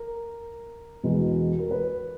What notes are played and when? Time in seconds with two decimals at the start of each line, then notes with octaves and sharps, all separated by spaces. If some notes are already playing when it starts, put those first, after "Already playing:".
Already playing: A#4
1.03 E2 B2 G#3
1.59 A#4
1.71 B4